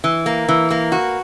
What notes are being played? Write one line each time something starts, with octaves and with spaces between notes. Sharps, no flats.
E3
A#3
E3
A#3
F#4